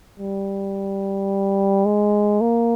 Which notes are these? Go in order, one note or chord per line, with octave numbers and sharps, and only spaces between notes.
G3
G#3
A#3